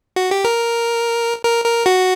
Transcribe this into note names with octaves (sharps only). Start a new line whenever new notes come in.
F#4
G4
A#4
A#4
A#4
F#4